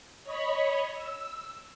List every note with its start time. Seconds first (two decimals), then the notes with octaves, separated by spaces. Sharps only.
0.24 C#5 D#5 B5
0.94 E6